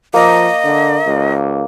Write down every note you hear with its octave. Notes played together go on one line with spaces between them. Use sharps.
F3 A#3 D#5
D3
C#2